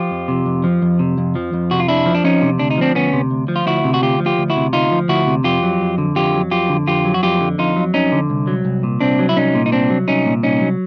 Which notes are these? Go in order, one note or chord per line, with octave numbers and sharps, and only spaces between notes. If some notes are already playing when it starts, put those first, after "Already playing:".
Already playing: F3 F4 G4
F2
C3
F2
F3
F2
C3
F2
F3
F2
C3 F#4
F4
F2 D4 E4
F3
D4
F2 C#4 D#4
C3
D2 D4
D#4
F3 C4 D4
D2 B3 C#4
C3
D2
F3
F4
D2 E4 F#4
C3
F#4
D2 F4 G4
F3
F4 G4
D2
E4 F#4
C3
D2 D#4 F4
F3
D2 E4 F#4
C3
F2 F4 G4
F#3
F2
D3
F2 F4 G4
F#3
F2 F4 G4
D3
F2 F4 G4
F#3
F#4
F2 F4 G4
D3
F2 D#4 F4
F#3
F2 C#4 D#4
D3
C2
F#3
C2
A#2
C2 C4 D4
F#3
E4
C2 C#4 D#4
A#2
D#4
C2 C4 D4
F#3
C2 C#4 D#4
A#2
C2 C#4 D#4
F#3